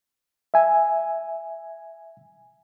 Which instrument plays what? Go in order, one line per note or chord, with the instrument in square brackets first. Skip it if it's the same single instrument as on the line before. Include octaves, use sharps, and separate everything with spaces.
[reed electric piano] E5 G#5